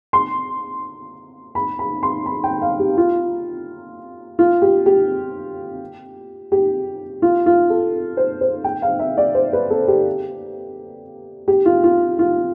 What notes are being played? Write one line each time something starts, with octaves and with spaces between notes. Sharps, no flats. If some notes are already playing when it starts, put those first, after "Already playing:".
C6
B5
B5
C6
B5
G5
F5
G4
F4
F4
G4
G4
G4
F4
F4
A4
C5
C5
G5
F5
E5
D5
C5
B4
A4
G4
G4
F4
F4
F4